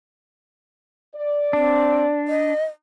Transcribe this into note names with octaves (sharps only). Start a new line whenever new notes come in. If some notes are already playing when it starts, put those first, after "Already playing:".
D5
C4 D4
D#5